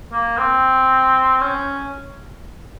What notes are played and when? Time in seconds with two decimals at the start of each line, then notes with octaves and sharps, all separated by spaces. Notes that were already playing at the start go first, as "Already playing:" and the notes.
0.12 A#3
0.37 C4
1.41 C#4